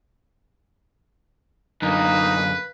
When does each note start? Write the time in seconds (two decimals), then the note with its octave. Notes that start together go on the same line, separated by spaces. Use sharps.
1.82 F#2 D3 A#3 D#4 B4